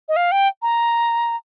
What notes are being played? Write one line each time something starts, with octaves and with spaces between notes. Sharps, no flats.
D#5
F5
G5
A#5